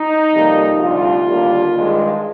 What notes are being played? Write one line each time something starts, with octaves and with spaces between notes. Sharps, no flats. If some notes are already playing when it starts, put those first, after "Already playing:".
Already playing: D#4
F2 C3 G3 A#3
D2 C3 G3 F4
D#2 D3 G3 A#3
G2 D#3 G#3